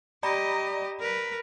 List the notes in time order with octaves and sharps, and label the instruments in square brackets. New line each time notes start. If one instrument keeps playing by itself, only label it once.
[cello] G4 D#5 [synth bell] D5 A#5 B5
[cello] A#4 B4